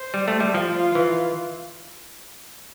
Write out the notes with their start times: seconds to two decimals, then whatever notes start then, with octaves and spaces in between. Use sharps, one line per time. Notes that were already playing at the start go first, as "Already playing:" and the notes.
Already playing: C5
0.14 G3
0.28 A3
0.40 G3
0.54 F3 F4
0.95 E3